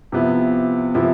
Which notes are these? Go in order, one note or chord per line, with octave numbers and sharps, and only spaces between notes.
C3 F3 B3 E4
C3 F3 B3 E4